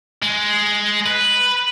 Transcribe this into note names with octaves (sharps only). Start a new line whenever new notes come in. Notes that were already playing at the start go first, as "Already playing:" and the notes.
G#3
B4